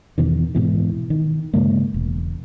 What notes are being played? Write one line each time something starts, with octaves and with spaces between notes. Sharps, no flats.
E2 B2 D#3
G#2 B2 E3
D#3
G2 C#3 G#3 A#3
E1